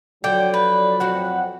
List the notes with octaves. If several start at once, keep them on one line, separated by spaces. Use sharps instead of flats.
D3 F3 F#3 D5 G5
B4
F2 C4 F#4 F#5